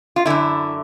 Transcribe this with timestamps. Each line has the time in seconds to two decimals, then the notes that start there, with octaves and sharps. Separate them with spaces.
0.16 F4
0.26 F#2 D3 E4